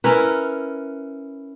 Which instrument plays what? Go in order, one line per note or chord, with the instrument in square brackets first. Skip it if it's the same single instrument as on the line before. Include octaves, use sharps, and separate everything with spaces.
[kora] C#4 E4 A#4 B4